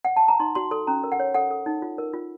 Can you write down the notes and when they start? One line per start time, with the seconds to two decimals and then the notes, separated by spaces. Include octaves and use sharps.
0.05 F#5
0.16 A5
0.28 A#5
0.40 D#4 C6
0.55 F#4 C6
0.71 A4 C6
0.87 C#4 A#5
1.04 A#4
1.12 F#5
1.20 C#5
1.34 A4 F#5
1.51 A4
1.66 D#4
1.82 F4
1.98 A#4
2.13 F4